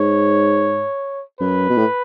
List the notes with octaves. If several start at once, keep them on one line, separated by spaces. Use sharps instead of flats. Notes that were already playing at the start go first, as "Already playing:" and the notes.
Already playing: G#2 C#5
F#2 B4
B2
A2